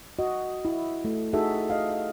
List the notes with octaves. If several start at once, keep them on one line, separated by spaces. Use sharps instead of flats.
F#4 D#5
E4
A3
D#4 F#4 G#4 A4 E5
D#5 F5